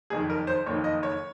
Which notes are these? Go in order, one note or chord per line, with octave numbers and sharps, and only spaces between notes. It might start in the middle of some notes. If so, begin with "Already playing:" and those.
F#1 F2 D#3 G#4
A#4
C5
F#1 F2 D#3 A#3 C#5
D#5
C#5